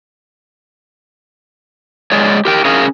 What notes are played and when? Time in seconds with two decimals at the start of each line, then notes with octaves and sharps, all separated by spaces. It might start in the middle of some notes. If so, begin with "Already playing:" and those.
2.12 G#3 G#4 C#5 D5
2.45 G4 A#4 G5
2.65 C#4 G#4 A#4 C#5 F5